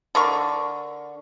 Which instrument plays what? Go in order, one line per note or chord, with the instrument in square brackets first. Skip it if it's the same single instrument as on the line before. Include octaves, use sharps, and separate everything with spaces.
[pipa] D3 A#4 C#6